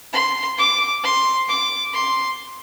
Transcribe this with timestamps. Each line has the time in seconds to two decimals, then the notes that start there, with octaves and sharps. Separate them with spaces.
0.13 C6
0.58 D6
1.04 C6
1.49 D6
1.93 C6